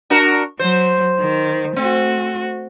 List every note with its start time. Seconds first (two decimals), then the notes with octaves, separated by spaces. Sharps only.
0.10 D4 F#4 A#4
0.59 F#3 C5
1.20 D#3
1.76 A3 C4 F#4